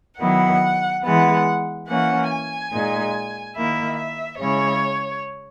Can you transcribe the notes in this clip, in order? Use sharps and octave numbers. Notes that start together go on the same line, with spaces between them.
D#3 F#3 B3 E4 F#5
E3 G#3 B3 F#5
E3 A#3 C#4 F#5
G#5
A#2 G#3 D#4
D#3 A#3 E4 E5
E5
C#3 G#3 C#4 E4 C#5